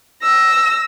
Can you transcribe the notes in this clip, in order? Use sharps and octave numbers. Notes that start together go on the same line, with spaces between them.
E6 A#6